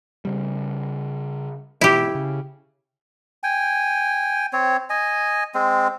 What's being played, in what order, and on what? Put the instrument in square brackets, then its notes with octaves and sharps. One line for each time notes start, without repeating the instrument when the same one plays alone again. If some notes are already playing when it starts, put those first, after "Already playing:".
[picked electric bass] C#3 G3
[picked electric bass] G#2 B2 E3 [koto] E4 G4
[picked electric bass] C#3
[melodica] G5 G#5
C4 C#5
D#5 G#5
G#3 C4